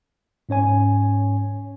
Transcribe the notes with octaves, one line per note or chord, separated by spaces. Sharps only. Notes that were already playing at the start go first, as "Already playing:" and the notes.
G#2 C#4 C#5 G#5